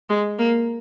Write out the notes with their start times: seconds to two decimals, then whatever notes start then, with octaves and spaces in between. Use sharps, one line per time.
0.09 G#3
0.38 A#3